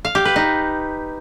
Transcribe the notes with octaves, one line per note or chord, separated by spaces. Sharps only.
F5
G4
B4
D#4